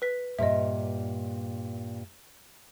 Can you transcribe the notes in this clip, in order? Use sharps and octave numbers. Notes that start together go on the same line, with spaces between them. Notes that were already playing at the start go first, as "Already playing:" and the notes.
B4 B6
G2 A#2 D#5 E5